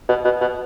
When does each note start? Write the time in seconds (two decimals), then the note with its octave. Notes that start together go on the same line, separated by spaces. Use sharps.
0.09 B2
0.25 B2
0.41 B2